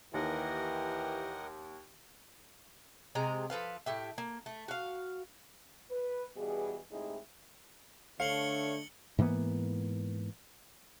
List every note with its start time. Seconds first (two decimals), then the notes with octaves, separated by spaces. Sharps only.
0.14 D#2 E3 G4 A#4 D#5 F#5
3.15 C3 G#3 G#5 A#5
3.50 F3 A4 B4 F5
3.86 A2 G4 E5
4.18 A#3
4.46 A3
4.68 F#4 F5
5.91 B4
6.36 B2 E3 G3 G#4
6.91 A2 C3 G#3 D#4 E4 G#4
8.20 D3 A3 D4 C#5 F5 C#7 F#7 G7
9.19 G#2 E3 A#3 B3